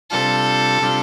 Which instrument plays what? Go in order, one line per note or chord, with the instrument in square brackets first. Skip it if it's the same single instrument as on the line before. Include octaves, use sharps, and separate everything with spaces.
[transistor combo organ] C3 G3 D4 F4 [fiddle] A4
[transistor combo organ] C3 G3 D4 F4